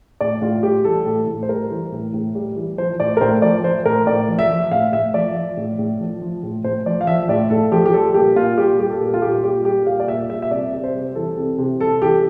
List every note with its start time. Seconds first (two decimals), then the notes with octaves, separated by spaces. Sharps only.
0.21 A2 D5
0.42 A2 F4
0.63 G3 G4
0.84 E3 A4
1.06 A2
1.27 A2
1.43 C5
1.49 G3 A#4
1.71 E3
1.92 A2
2.14 A2
2.35 G3
2.56 E3
2.78 F3 C5
3.00 A2 D5
3.17 A#4
3.21 A2 C5
3.42 F3 D5
3.64 F3 C5
3.85 A2 A#4
4.07 A2 D5
4.28 F3
4.39 E5
4.50 F3
4.71 A2 F5
4.93 A2 E5
5.14 F3 D5
5.36 F3
5.57 A2
5.79 A2
6.00 F3
6.22 F3
6.43 A2
6.64 A2 C5
6.86 F3 D5
7.01 F5
7.07 F3 E5
7.29 A2 D5
7.50 A2 A4
7.72 F3 G4
7.86 G4
7.94 G3 A4
8.14 A#2 G4
8.36 A#2 F4
8.58 G3 G4
8.80 G3 G4
8.90 A4
9.01 A#2
9.14 F4
9.22 A#2 G4
9.44 G3 G4
9.65 G3 G4
9.87 A#2 F5
10.00 D5
10.08 A#2 E5
10.29 G3 E5
10.42 E5
10.51 C3 D5
10.73 C3
10.84 C5
10.94 G3
11.15 E3 A4
11.37 C3
11.58 C3
11.80 G3 A4
12.02 E3 G4